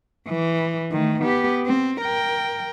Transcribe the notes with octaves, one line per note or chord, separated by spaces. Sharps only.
E3
D#3 A3
B3 G4
C4
A#4 G5